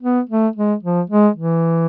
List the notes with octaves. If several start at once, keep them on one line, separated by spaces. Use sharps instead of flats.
B3
A3
G#3
F3
G#3
E3